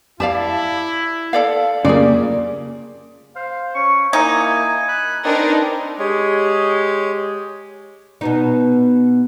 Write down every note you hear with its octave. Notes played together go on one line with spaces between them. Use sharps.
E4 G4 D5 F5 A5
A4 D5 F5
C#3 A#3 F4 G4 G#4 D5
C5 F5
C#4 C#6
A#3 D#4 E4 G#5
B5 F#6
C4 D4 D#4 A#4 B4 D5
G#3 G4 C#5
B2 B3 D#4